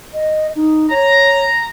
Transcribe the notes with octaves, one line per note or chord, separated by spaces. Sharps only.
D#5
D#4
C#5 A#5